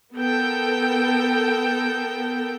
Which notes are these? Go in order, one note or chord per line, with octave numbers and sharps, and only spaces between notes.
B3 A4 A#4 G5